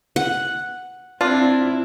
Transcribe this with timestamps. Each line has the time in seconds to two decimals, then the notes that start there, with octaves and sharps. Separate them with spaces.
0.16 F#5
1.21 C4 D4 E4 F4